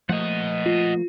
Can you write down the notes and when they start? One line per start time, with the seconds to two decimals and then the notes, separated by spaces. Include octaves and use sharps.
0.09 F3 A3 A#3 D#5 F#5
0.66 F4